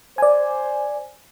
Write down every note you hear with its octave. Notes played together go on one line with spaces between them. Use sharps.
C5 D5 G#5